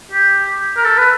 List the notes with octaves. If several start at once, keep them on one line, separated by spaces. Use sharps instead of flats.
G4
A#4
A4
B4